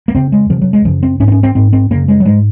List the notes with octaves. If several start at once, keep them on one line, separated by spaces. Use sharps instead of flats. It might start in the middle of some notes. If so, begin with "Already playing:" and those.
A#3
F2 C#3 C4
G#3
F2 C3 F3
F#3
G#3
F#2 C#3 F3
C4
G#2 C#4
C4
C#4
C4
G#2 C4
C4
F#2 C#3 A#3
G#3
F#3
G#2 G#3